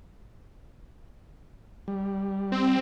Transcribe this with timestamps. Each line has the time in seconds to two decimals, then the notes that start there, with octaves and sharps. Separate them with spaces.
1.88 G3
2.52 C4